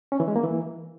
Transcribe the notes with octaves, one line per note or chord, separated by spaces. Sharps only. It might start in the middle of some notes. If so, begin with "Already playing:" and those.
C#4
E3
G#3
A#3
E3